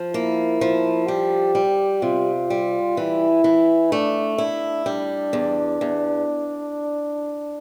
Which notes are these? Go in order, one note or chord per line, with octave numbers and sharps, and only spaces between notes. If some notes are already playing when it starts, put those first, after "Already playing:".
Already playing: F3
A#3 E4
F3
G3 G4
G3
C3 F4
G3
E3 E4
E3
A3 D4
D4 E4
G3 D4
E2
E2